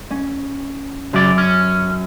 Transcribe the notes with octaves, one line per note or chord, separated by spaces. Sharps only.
C#4
F#2 C#3 D5
C#4